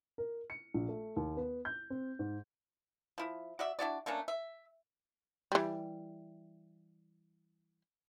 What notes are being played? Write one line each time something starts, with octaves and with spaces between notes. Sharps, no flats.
A#4
C#7
A#1
A3
D#2
B3
G6
C4
G#2
F3 E4
F#4 D5 E5
D4 E4 F#4 D5
A3 A#3 C#4 D4
E5
E3 G3